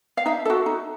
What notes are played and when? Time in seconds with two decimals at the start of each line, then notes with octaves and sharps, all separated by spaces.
0.17 F5
0.26 D#4 E5
0.45 F#4 A4
0.66 D#4